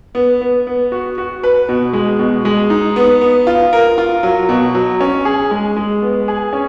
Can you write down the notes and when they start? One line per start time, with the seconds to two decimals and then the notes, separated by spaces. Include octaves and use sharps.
0.15 B3
0.41 B3
0.67 B3
0.92 F#4
1.18 F#4
1.43 B4
1.69 B2
1.93 G#3
2.19 B2
2.45 G#3
2.70 D#4
2.96 B3
3.21 B3
3.47 F4
3.73 A#4
3.98 F4
4.23 F#3
4.49 B2
4.75 F#3
5.00 C#4
5.25 G#4
5.51 G#3
5.77 G#3
6.02 B3
6.28 G#4
6.53 C#4